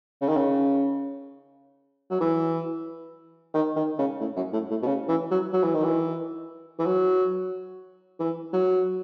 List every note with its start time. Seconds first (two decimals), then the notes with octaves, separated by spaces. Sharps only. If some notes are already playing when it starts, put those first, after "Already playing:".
0.21 C#3
0.29 D#3
0.37 C#3
2.11 F#3
2.20 E3
3.54 D#3
3.76 D#3
3.99 C#3
4.20 A2
4.36 F#2
4.53 A2
4.70 A2
4.82 B2
4.87 C#3
5.08 E3
5.31 F#3
5.53 F#3
5.63 E3
5.74 D#3
5.84 E3
6.79 E3
6.86 F#3
8.20 E3
8.53 F#3